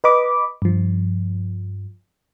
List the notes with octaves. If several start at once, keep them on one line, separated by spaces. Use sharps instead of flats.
B4 D#5 B5 D6
G2 F3